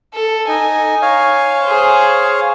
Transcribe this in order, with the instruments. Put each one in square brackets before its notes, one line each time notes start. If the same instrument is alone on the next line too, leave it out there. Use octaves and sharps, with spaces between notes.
[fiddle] A4
[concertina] D#4 [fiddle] G#5
[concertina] C#5 F5
[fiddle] G#4 C5